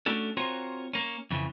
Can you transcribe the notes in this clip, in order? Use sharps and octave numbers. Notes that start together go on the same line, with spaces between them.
A3 C#4 D4 F#4 A4
C4 F4 F#4 A#4 C5 C#5
A#3 C#4
F2 C#3 E3